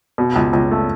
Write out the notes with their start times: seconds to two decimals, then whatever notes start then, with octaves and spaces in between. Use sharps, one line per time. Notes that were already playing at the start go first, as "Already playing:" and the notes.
0.18 B2
0.36 C#2
0.53 C#2
0.71 A3